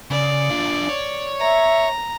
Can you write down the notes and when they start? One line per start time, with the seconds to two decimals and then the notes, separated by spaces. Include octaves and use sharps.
0.11 C#3 D5
0.50 D4 F4
0.89 C#5
1.40 E5 A#5